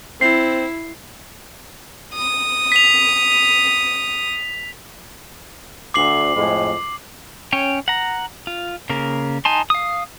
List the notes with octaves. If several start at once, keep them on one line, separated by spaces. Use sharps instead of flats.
C4 E4 C7
D#6
B6 F7
D2 D6 C7 F#7
F2 A2 G#3
C#4 C#5 G5
F#5 A#5
F4
C#3 A#3 A#4
D#4 G#5 A5 C6
F5 D#6